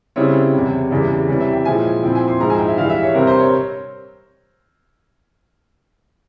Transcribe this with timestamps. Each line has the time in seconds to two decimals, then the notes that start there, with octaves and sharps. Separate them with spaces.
0.16 C#3 G3 C4 E4 C#5
0.53 E2 C3 G3
0.91 E2 C#3 E3 G3
1.28 C3 E3 G3 C#5
1.40 E5
1.54 G5
1.65 A#2 F3 G#3 E4 G#5
2.03 A#2 F3 C4 E4 G5
2.15 G#5
2.28 C6
2.40 G#2 F3 G#3 E4 A#5
2.50 G#5
2.58 G5
2.68 E5
2.77 G2 E3 G#3 F5
2.90 E5
3.03 C#5
3.14 C3 G3 C4 A#4
3.27 C5
3.40 C#5